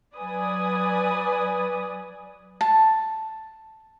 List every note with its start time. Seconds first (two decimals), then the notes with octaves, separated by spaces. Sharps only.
0.16 F#3 B4 D5 G#5 D#6
2.61 A5